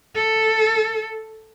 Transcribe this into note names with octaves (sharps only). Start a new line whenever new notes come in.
A4